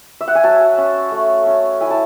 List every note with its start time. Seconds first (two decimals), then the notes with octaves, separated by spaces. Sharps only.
0.21 E5
0.27 F#5
0.35 G#5
0.43 F#3 A5
0.78 C#4
1.11 A3
1.46 C#4
1.80 E4 G#5
1.90 A5